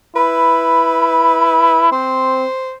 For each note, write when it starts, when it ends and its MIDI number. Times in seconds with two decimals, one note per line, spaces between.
0.16 1.90 64
0.16 1.86 71
1.92 2.44 60
1.92 2.74 72